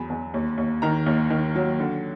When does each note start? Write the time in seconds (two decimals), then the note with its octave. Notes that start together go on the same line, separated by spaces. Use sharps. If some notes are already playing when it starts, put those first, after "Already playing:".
Already playing: E2 F#3 B5
0.10 E2
0.34 D#2
0.58 D#2
0.82 D#3 A#5
1.06 D#2
1.30 D#3
1.56 F#3
1.80 D3